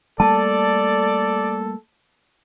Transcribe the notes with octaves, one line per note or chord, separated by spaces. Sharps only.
G3 A3 A#3 A4 D5 A5